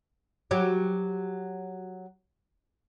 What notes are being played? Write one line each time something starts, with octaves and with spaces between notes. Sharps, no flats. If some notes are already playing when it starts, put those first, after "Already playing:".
F#3 G4